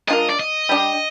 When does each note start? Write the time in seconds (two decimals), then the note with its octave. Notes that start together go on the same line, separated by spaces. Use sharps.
0.08 G#3 D4 F4 A#4 D#5
0.29 D5
0.40 D#5
0.69 G3 D4 G4